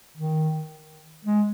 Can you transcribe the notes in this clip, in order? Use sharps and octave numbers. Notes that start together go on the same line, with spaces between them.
D#3
G#3